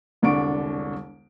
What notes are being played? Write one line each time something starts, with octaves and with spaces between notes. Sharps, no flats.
E1 C2 D3 D4 C#6 D7